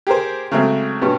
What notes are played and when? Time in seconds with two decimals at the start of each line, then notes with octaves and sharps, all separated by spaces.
0.07 G4 G#4 A#4 C5
0.51 C#3 F#3 G#3 A3 C4
1.02 G2 B2 C#4